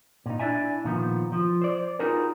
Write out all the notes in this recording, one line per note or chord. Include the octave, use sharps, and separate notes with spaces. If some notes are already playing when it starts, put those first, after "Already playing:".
A#2 D#4
D4 E4 D5 E5 G#5
A#2 D#3 F3 B3
F3
C5 D5
D#4 F4 F#4 G#4 A#4 B4